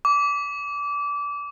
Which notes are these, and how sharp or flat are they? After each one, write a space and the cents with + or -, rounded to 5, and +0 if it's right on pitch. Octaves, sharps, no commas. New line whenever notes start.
D6 -25